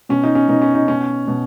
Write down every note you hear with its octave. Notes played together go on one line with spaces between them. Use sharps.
B2 C#4
D#4
C#4
B2 D#4
C#4
D#4
B2 C#4
B2